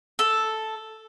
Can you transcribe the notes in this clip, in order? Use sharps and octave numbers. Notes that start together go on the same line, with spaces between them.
A4